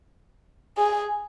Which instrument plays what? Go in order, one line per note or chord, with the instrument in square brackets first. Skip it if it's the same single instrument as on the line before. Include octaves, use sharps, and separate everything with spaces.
[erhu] G#4